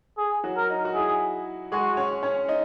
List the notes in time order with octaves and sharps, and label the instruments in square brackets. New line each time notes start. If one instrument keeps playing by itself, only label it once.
[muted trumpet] G#4
[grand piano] F#3 F#4
[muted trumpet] A#4
[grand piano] D#4
F#4
[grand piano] E4 [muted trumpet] G#4
[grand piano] G#3 G#4 [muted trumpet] F#4
[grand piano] C#4 C#5
C#4 C#5
D#4 D#5